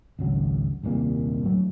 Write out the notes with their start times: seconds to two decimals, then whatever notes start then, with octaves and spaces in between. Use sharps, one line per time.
0.19 G#1 C#2 F#3
0.84 D#1 C2 A#2 A#3
1.44 A2 F#3